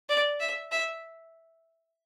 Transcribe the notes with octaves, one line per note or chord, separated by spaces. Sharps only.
D5
E5
E5